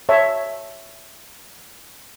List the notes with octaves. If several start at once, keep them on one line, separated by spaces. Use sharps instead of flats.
C#5 E5 A5